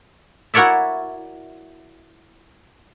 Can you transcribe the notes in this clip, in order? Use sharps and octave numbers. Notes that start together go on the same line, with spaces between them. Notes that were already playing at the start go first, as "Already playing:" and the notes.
E4 F#4 A#4 C#5 D5 E5